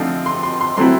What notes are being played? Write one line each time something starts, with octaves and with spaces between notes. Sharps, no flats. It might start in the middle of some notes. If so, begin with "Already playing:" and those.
Already playing: D3 F3 A3 C4 D#4
C6
C6
C6
F#3 A3 C4 E4 C6